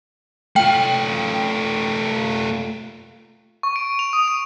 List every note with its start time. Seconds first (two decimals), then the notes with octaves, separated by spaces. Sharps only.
0.56 A3 F4 G5
3.63 C#6
3.76 D7
3.99 F7
4.13 D#6
4.28 F7